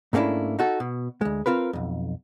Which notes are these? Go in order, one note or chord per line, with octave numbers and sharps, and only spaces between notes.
G#2 A3 A#3 C#4 D4 E4
D#4 F#4 A4
B2
D2 G#3
C4 F4 A#4 B4
B1 F2